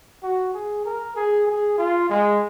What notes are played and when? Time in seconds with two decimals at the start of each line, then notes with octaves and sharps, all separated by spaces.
0.23 F#4
0.54 G#4
0.85 A#4
1.16 G#4
1.47 G#4
1.78 F4
2.09 G#3